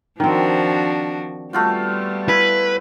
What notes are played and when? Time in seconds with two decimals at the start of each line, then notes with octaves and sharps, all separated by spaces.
0.20 D#3 F3 C4 D4 F#4
1.53 G3 A3 B3 F4 F#4
2.29 E4 B4